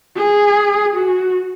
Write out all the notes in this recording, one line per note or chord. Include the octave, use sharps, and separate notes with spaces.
G#4
F#4